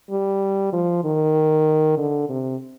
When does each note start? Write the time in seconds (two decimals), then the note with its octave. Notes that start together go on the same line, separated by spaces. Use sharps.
0.10 G3
0.73 F3
1.05 D#3
1.98 D3
2.29 C3